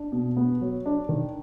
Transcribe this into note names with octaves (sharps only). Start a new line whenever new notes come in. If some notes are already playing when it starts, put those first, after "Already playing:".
Already playing: D4
B2
B3
F#3
D4
D#3